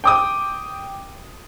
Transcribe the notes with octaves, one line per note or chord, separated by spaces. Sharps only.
G5 D6 D#6